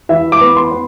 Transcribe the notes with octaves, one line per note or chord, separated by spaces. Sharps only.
E3 E5
D6
B3
C6
B3